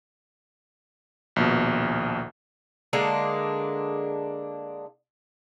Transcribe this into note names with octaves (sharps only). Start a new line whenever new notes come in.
A#1 D#2 B2
D3 G#3 A#3 D4